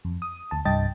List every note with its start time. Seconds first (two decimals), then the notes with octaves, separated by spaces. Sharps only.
0.05 F2
0.22 D#6
0.51 D2 A5
0.65 C2 G2 D#5 G5 A5 A6